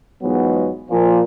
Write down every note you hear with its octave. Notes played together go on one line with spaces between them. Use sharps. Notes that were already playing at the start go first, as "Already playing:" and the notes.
E2 G#2 F3 F#3 G#3 B3
A#2 F3